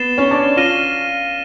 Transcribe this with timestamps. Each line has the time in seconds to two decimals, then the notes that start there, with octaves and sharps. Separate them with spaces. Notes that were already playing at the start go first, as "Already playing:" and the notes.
Already playing: B3 A6 C7 E7 G7
0.18 C#4 C#5
0.31 D4 D5
0.56 F4 F5 F6 A#6 D#7 G7